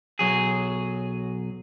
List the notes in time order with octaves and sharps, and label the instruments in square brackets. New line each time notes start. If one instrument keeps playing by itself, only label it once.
[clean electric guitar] B1 F#3 G#4